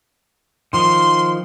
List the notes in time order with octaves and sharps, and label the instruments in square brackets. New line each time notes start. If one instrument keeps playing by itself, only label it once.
[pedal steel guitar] D#3 F3 [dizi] C6